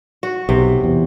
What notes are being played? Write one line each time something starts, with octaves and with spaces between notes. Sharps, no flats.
F#4
B1 C3
E2